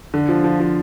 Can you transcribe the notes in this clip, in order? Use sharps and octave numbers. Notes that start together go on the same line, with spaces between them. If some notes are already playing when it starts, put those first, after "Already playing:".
D3
F3
F3
F3